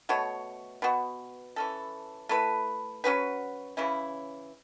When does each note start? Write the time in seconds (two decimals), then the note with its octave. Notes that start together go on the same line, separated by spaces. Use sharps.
0.09 B2 A3 F#4 C#5
0.82 B2 B3 F#4
1.56 E3 C#4 A4
2.29 A3 E4 B4
3.04 F#3 C#4 F#4 B4
3.77 C#3 E3 C#4 E4